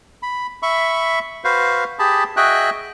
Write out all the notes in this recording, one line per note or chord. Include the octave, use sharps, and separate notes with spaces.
B5
E5 B5 C#6
F#4 B4 C5 F5
G4 G#4 A5 B5
F#4 G#4 D#5 E5 G5 F#6